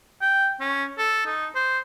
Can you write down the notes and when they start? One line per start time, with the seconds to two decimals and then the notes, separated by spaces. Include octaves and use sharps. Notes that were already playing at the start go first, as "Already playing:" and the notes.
0.22 G5
0.60 C#4
0.98 A4
1.26 D#4
1.55 C5